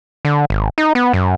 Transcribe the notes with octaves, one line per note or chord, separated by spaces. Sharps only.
D3
G#1
D#4
B3
F#2